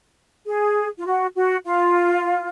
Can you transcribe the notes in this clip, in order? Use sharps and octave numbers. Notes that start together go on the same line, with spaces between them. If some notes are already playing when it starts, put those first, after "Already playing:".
G#4
F4
F#4
F#4
F4